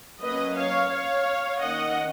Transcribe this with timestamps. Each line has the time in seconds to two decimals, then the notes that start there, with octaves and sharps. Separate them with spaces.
0.21 F#3 A#3 C#4 B4 D#5
0.56 C#5 F5
0.90 C#5 F5
1.59 D#3 A#3 C#4 D#5 F#5